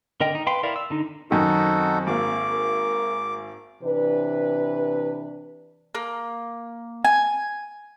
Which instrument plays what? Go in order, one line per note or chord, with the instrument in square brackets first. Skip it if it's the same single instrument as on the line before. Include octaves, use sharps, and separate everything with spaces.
[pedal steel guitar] D3 A#4 D#5 G5
D#4
B4 F5 G5 C6
E4 A#4 D5 F5
E6
D3 D#4
[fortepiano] F#2 D#3 [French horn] C4 [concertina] D#4 F#4 A4
[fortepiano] G#1 A#3 [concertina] D6
[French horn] A#4
[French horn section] C3 E3 D4 B4
[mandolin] A#3
G#5